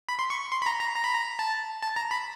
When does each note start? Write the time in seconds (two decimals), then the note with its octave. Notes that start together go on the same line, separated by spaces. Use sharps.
0.09 B5
0.19 C6
0.30 C#6
0.52 C6
0.62 B5
0.66 A#5
0.80 A#5
0.96 A#5
1.04 B5
1.14 A#5
1.39 A5
1.83 A5
1.96 A#5
2.11 B5